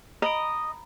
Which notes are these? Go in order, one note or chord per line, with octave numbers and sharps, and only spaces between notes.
D#5 A#5 B5 D7